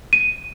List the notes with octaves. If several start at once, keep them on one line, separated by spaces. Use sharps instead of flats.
D#7